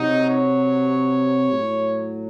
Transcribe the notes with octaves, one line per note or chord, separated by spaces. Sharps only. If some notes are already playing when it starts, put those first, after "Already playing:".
Already playing: C3 F#3 D#4
C#5
A2 F#3